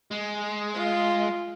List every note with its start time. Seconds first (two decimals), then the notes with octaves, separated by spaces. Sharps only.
0.11 G#3
0.75 F4